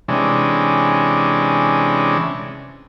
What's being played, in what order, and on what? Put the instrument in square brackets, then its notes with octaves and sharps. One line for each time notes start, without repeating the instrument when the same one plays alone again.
[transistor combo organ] C3 E3 G#3 C#4 D4